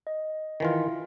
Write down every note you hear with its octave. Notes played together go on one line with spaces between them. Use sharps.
D#5
D#3 E3 F4